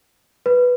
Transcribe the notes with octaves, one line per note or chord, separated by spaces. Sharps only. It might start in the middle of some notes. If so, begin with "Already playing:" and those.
B4